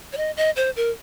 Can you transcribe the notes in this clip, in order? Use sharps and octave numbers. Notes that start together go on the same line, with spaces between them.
C#5
D#5
D#5
C5
A#4